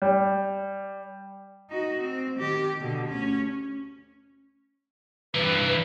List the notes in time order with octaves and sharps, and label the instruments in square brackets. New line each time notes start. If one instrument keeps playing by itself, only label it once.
[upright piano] G3
[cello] D#4 F#4
C4
D#3 G4
B2 D3
D2 C#4
[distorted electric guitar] G2 E3 [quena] B4